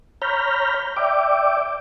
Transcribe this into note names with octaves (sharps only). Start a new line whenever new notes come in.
C#5 A#5 B5 F6 G6
D5 E5 G5 D6